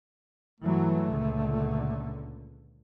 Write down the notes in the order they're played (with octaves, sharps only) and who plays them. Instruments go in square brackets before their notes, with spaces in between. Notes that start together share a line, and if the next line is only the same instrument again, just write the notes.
[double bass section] G2 E3 F#3 [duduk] A3
[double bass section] C#2 A#2 D3